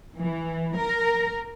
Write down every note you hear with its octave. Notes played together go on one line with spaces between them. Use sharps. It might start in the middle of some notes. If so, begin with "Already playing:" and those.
E3
A#4